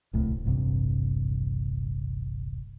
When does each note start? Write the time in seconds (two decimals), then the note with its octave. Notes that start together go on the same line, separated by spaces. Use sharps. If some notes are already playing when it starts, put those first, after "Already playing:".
0.13 D1 C2 A2
0.44 D#1 A1 G2 C3